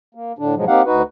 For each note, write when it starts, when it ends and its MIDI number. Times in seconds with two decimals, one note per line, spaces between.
0.15 0.32 58
0.39 0.55 45
0.39 0.55 50
0.39 0.55 62
0.55 0.65 44
0.55 0.65 47
0.55 0.65 53
0.55 0.65 54
0.55 0.65 56
0.68 0.82 58
0.68 0.82 60
0.68 0.82 63
0.68 0.82 67
0.68 0.82 77
0.68 0.82 78
0.86 1.02 38
0.86 1.02 63
0.86 1.02 66
0.86 1.02 71